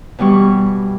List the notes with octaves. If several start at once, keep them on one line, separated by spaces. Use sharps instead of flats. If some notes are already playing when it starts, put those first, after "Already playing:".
B2 E3 G3 C#6